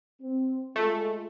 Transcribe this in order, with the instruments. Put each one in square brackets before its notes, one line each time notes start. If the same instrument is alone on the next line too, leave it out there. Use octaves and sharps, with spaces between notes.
[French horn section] C4
[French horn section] G#3 F4 [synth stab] A3